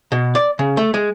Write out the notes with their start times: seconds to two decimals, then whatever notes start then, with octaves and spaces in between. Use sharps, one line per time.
0.12 B2
0.35 D5
0.59 C#3
0.77 A3
0.94 G#3